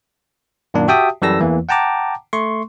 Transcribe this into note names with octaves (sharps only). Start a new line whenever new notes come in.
F#2 A#2 D#3 A#3 D4
F#4 G4 E5 G5 A5 D#6
F#2 E3 G3 A4 E6 A#6
E2 E3 A#3
F#5 G5 A5 A#5 D6
A3 C6 C#6